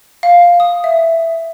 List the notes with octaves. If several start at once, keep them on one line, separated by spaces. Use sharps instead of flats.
F5
D#6
E5